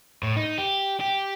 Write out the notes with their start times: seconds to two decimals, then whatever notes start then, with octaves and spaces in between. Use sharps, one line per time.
0.23 A2
0.37 D#4
0.58 G4
1.01 G4